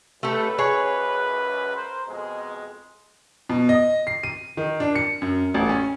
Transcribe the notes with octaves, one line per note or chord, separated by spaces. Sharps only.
C#2 F#2 A3 G4 A4 B4
G#4 C#5
A#4 C5
F2 B2 G#3
B2
D#5
C7
D#7
D#3
D4
C#7
F#2
A1
C#4